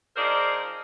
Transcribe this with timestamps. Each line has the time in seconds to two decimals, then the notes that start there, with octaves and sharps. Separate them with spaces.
0.16 F3 D#4 G#4 A#4 C5 D5